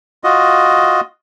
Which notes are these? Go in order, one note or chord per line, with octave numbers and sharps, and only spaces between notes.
F4 F#4 D#5